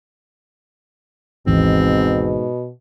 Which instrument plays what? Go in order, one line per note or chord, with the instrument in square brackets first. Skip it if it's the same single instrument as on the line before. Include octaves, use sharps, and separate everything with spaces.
[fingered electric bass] G#1 D#2 E3 [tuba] G#2 [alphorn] B2 [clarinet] C4